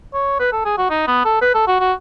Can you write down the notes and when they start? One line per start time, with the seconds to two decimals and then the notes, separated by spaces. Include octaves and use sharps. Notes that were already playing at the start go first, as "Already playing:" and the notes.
0.14 C#5
0.40 B4
0.53 A4
0.65 G#4
0.78 F#4
0.90 D#4
1.07 B3
1.25 A4
1.42 B4
1.55 A4
1.68 F#4
1.80 F#4